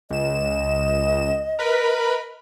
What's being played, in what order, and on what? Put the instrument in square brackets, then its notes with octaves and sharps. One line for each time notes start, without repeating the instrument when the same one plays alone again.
[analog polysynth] C#2 E7 [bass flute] D#5
[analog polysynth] A#4 B4 B5